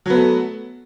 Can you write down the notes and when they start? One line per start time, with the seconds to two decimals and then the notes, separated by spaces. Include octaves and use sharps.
0.06 F#3
0.10 B3
0.14 A3